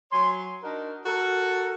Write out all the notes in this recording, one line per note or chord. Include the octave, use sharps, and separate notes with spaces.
F#3 C#5 G#5 C6
D4 D#4 F#4 A#4
F#4 A4 A#4